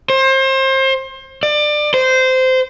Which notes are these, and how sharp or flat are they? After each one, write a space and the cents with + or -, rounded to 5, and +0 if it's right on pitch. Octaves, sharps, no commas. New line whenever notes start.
C5 +30
D5 +25
C5 -15